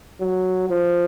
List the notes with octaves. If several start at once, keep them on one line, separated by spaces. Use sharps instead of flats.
F#3
F3